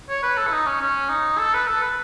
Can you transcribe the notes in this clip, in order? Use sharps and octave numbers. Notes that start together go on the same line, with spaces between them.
C#5
B4
A4
E4
D#4
C#4
C#4
D#4
A4
B4
A4
B4